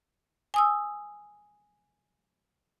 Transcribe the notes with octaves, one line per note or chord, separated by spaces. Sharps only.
G#5 D#6 E6